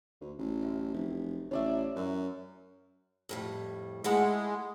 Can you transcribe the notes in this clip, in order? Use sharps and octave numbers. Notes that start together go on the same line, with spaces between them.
D2
A1
F#2
F1
A1 C#5 D5 E5
F#2
F2 A2 G3
G#3 A3 E4 F#5